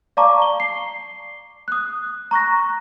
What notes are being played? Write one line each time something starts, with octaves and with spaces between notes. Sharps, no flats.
D5 F5 A5 A#5 C#6 D6
G7
C7
D#6 F#6
A#5 C#6 F#6 A#6